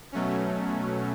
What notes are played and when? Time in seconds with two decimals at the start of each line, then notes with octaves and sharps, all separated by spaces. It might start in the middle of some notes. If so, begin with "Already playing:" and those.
0.12 B2 F#3 A3 C#4